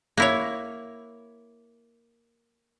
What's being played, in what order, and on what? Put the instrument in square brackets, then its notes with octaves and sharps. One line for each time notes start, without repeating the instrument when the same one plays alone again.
[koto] A#3 E4 C#5